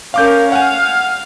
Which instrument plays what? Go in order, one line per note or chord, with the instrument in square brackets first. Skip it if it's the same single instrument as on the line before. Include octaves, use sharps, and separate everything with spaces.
[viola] C#4 A#4 [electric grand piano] F5 D6 G6
[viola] F5 [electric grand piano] F#5 G#5